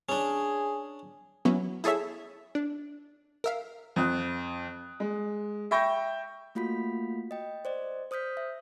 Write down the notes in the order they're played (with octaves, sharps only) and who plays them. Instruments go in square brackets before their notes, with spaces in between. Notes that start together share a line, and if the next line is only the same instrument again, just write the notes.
[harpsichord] C#4 D4 [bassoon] G#4
[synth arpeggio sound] F#3 B3 C#4 E4
E4 G#4 A4 C#5 E5
D4
A#4 E5 F5
[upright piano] F2 D#6 F#6
G#3
E5 G5 B5 C#6 G6 A#6
[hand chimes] A3 A#3 F4 F#4 B5 B6
D#5 G5
C5 D5 D#5
C5 D#6 F6 G6 B6
E5